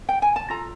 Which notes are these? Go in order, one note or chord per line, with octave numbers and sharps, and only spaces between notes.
G5
G#5
A5
F4 A4 A#5